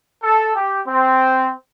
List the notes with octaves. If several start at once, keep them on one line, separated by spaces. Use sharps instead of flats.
A4
G4
C4